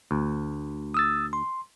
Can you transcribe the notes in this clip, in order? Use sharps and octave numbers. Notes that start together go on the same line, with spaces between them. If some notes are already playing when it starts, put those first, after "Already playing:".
D2
D#6 E6 A6
C6